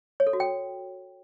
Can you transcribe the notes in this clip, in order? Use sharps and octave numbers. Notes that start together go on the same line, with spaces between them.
C#5
A4
F#4
G5